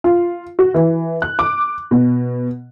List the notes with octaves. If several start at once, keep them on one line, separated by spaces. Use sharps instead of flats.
F4
F#4
E3
F#6
D6
B2